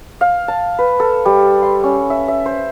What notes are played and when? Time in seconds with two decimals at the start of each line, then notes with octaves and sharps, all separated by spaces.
0.21 F5
0.48 A5
0.79 B4
1.00 A4
1.25 G3
1.63 C6
1.84 C#4
2.10 E5
2.28 E5
2.46 C5